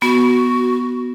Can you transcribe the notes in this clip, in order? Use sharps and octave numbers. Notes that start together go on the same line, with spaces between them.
B3 F#4